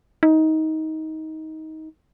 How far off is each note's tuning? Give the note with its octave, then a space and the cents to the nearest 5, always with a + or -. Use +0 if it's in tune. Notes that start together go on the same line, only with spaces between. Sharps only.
D#4 +20